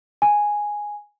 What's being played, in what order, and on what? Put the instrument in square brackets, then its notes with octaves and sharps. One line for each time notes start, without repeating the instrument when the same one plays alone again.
[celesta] G#5